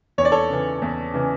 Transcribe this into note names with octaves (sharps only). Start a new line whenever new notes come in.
E2 C#5
D5
A4 C#5
C#3 E3
E2
C#3 E3